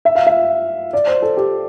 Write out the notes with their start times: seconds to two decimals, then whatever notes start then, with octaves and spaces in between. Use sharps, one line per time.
0.05 E5
0.15 F5
0.27 E5
0.93 D5
1.07 C5
1.22 A4
1.37 G4